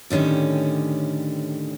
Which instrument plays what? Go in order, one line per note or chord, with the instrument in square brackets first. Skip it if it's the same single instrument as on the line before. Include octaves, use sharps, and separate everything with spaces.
[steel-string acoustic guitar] A2 D3 D#3 C#4 G4